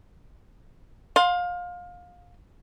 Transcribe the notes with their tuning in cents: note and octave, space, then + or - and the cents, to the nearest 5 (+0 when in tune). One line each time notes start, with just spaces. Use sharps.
F5 +25 C6 +10